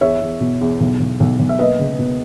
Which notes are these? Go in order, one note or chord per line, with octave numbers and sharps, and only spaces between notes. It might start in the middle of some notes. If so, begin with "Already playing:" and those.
E2 C#5 E5
E2
B2
E2
B1
B1
B1
B1
E5
A#3 B4 D#5
C#2
B2